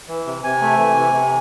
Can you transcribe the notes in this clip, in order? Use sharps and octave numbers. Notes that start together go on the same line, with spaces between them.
E3
C3
C3 G#5
A3
E3
C3
C3